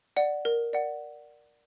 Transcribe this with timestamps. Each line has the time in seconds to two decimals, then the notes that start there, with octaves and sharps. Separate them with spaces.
0.17 D5 F#5
0.45 A#4
0.73 D5 F#5